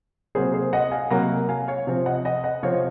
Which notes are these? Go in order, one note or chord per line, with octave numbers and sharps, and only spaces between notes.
C3 F#3 A#3 G#4 C5
G#4 C5
D#5 F#5
F5 G#5
C3 F#3 A#3 F#5 A#5
F5 G#5
C#5 F5
C3 F3 C4
D#5 F#5
D#5 F#5
D#5 F#5
C3 F3 C4 C#5 F5